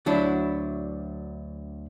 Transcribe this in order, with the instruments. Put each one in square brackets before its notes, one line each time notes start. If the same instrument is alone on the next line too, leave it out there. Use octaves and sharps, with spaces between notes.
[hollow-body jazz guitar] D2 F#3 D4 E4